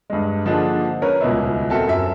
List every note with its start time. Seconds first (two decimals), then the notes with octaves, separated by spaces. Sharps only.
0.10 G2 G#3
0.45 D3 F3 A#3 D4 D#4 G#4
1.02 C#4 A#4 B4 C#5
1.21 D#1 C#2 B2 D#4 E4
1.70 C4 F#4 A4 A#4 E5
1.87 F#2 E5